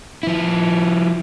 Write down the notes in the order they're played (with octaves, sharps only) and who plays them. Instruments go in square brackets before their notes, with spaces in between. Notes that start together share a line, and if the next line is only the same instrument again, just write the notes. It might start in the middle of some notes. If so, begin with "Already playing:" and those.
[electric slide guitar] F3 E4